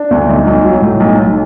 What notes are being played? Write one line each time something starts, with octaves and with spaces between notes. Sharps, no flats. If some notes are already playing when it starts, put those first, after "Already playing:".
Already playing: D4
D2
B1
B1
F#3
A2
B1
B1